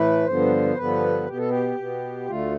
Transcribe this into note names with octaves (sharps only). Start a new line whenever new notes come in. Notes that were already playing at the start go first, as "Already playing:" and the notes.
Already playing: A2 E3 A3 B4
G2 D3 F3 B3 C5
G2 D3 F3 B3 B4
B2 B3 G4
A4
G4
B2 B3
D2 D3 A3 F4